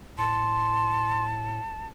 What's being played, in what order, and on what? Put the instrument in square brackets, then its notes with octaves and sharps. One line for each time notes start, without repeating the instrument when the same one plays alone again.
[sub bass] A2 [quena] A5 [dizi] C6